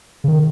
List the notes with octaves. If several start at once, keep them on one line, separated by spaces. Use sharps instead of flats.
C#3
D#3